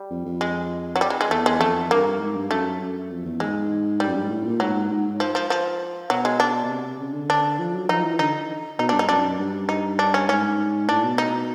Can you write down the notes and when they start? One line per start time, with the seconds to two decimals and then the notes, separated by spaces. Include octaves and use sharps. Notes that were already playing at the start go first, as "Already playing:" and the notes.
Already playing: G3
0.11 F2
0.26 F2
0.41 G#3
0.96 F#3
1.01 G3
1.10 G#3
1.21 G#3
1.30 E2 A3
1.46 G#3
1.61 F2 A3
1.90 G2 A#3
2.21 G#2
2.36 G2
2.51 F#2 A3
2.81 F#2
3.11 F2
3.25 E2
3.40 G#2 G#3
4.00 G3
4.07 F#2
4.15 G2
4.23 G#2
4.30 A2
4.45 A#2
4.60 G#2 F#3
4.74 G#2
4.91 G#2
5.20 F3
5.35 F3
5.50 F3
6.10 B2 F#3
6.25 G#3
6.40 D4
6.65 B2
6.69 C3
7.00 C#3
7.14 D3
7.30 D4
7.59 F3
7.74 F#3
7.89 F3 D#4
8.04 E3
8.19 D3 D#4
8.79 B2 D#4
8.89 D4
8.94 G2
8.99 D#4
9.09 F#2 D4
9.39 G2
9.69 D#4
9.99 D4
10.14 C#4
10.29 G#2 C#4
10.89 A2 D4
11.04 B2
11.18 D#4